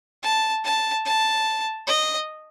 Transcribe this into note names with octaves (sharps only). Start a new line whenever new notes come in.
A5
A5
A5
D#5